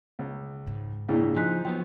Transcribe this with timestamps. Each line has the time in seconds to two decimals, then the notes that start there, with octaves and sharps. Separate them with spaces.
0.19 C#2
0.66 G#2 D#3
1.08 C#2 A#2 D4 E4 G#4
1.36 F3 D#4 G#5 F#6 B6
1.65 F3 F#3 B3 G5